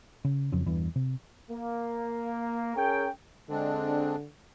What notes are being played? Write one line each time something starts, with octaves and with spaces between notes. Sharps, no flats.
C#3
F2 C#3 F3 F#3
E2 G2 E3
C3
A#3
C#4 G#4 A#4 C#5 G5
D3 G#3 C4 D4